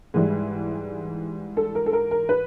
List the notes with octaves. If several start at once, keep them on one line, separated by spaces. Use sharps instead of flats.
G#2 E3 G3
A4
A#4
A4
A#4
A#4
B4